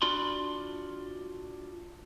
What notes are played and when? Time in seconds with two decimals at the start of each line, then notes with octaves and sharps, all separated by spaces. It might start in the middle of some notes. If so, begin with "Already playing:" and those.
0.02 D4 F4 F#4 D5 B5 C6